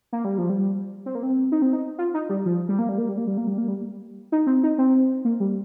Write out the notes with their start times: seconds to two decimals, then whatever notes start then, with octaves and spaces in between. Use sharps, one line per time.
0.13 A#3
0.25 G3
0.38 F3
0.50 G3
1.06 C4
1.15 A#3
1.23 C4
1.52 D#4
1.62 C4
1.73 D#4
1.98 F4
2.14 D#4
2.29 G3
2.46 F3
2.69 G3
2.79 A#3
2.89 G3
2.98 A#3
3.09 G3
3.18 A#3
3.28 G3
3.38 A#3
3.47 G3
3.58 A#3
3.68 G3
4.32 D#4
4.47 C4
4.63 D#4
4.78 C4
5.25 A#3
5.40 G3